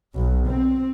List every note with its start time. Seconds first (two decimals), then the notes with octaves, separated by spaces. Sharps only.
0.15 B1
0.46 C4